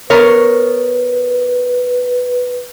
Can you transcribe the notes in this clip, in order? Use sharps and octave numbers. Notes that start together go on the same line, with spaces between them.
B3 A#4 B4 C#5